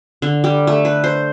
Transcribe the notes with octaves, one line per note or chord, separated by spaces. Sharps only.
D3
G3
A3
B4
C5